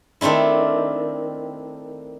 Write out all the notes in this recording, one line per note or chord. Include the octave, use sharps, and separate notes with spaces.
D#3 A3 C4 D4 E4